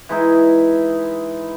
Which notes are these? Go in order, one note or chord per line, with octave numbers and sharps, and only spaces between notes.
E3 G#3 D#4 E4